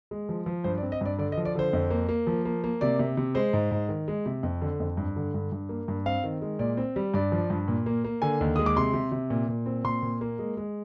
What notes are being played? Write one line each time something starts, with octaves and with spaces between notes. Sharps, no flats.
G#3
F3
F3
G2 C5
D5
C4
D#5
G2 D5
D3 D5
D#5
F3
D5
D3 C5
F2
A#3
A#3
F3
A#3
A#3
C3 D5
C3
C3
G#3 C5
G#2
G#2
D#3
G#3
C3
F2
D3
F2
G2
D3
G2
G2
A#3
G2
C4 F5
D#3
G#3
A#2 D5
C4
G3
G2 D5
F3
G2
A#2
A#3
A#3
D3 G#5
D#2
G#3 D#6
D6
C3 C6
C3
C3
A#2
A#2
C4
A#2 C6
A#2
A#3
G#3
G#3